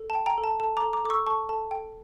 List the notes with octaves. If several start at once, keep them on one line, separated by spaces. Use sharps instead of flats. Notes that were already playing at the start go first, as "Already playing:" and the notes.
Already playing: A4
A5
G5
G5 A#5
A4
A5
A4 A5
A#5 D6
A4
A#5 D6
A4 D6
C#6 E6
A4 A5 C#6
A4 A5
A4 G5